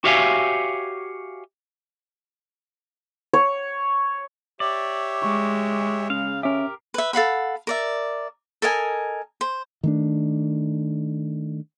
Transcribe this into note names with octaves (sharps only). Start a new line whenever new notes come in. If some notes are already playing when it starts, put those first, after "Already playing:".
F#4 G4 C#5 E5 F5 G#5
C#5
G4 C#5 D5 E5
G#3 C#6
C#3 C#4 F5
C#4 G4 A#4 E5
B4 E5
A4 F5 F#5 B5
A#4 D5 E5
A4 A#4 D#5 G#5
C5
D#3 A3 D4